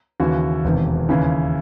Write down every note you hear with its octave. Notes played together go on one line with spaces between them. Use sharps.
D#2 C#3 E3 F#4
E1 E2 C3 D#3
D#2 C#3 E3